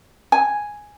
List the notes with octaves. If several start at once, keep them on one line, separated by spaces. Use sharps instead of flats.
G#5